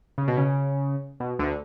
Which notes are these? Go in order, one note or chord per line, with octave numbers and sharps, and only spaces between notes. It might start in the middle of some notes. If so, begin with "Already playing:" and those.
C#3
B2
C#3
B2
D2 D3